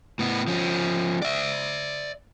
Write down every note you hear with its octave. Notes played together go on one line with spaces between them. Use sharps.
A2 B3
F3 C#4
D5 E5